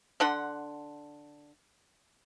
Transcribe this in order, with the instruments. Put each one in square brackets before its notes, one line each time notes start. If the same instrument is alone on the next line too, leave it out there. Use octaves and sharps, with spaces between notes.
[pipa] D3 D4 F#5 C6